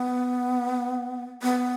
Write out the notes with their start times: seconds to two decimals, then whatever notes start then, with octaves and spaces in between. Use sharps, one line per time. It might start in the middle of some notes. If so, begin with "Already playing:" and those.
Already playing: B3
1.43 B3